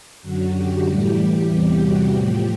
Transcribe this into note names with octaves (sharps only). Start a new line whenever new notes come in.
F#2 D3 F#3 F#4
G4
A2 E3 G3 G4
E2 C3 E3 G3 G4
F#4
A2 F3 G4